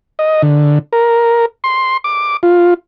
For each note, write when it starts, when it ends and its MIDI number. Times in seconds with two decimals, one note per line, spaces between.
0.19 0.42 75
0.43 0.79 50
0.93 1.46 70
1.64 1.97 84
2.04 2.37 86
2.43 2.74 65